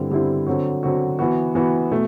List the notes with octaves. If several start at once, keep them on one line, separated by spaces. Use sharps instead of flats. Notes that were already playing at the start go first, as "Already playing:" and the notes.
Already playing: G2 D3 G3 C4 E4
G2 D3 G3 C4 E4
D3 F#3 C4 F#4
D3 F#3 C4 F#4
E3 B3 F#4
E3 B3 F#4
B2 A3